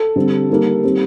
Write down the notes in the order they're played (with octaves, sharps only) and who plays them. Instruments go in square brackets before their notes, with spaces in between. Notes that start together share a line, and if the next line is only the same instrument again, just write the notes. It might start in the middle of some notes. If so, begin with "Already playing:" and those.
Already playing: [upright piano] A4
D3 G3 C4
D#3 G3 A#3
D#3 G3 C4